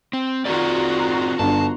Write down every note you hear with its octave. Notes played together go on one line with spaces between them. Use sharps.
C4
D#3 C4 F4 F#4 G#4 D5 A#5 C6
G1 D4 A5